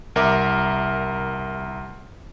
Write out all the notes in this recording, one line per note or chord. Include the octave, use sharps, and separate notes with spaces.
C2 A#4 E5 D6